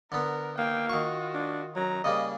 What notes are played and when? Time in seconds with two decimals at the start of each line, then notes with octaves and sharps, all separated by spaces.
0.12 D3 B3 A#4
0.58 A#3 G5
0.90 D#3 F4 F#4 C#6
1.35 D4
1.76 F#3 A#5
2.04 C#3 G3 A#3 G#4 D#5